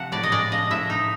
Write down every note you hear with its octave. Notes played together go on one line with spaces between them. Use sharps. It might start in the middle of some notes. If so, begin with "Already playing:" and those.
Already playing: C3 F3 F#5
A2 D5
D#5
G#3 D5
F3 D#5
A2 E5
D#4